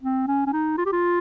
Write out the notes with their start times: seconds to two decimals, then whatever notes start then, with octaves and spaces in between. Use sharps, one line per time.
0.02 C4
0.27 C#4
0.46 C#4
0.53 D#4
0.78 F4
0.85 G4
0.92 F4